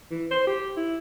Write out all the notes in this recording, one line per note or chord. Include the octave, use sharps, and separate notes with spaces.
E3
C5
G4
E4